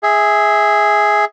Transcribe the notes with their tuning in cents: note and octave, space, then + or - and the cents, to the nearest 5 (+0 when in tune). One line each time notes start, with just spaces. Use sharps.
G#4 +0 E5 -20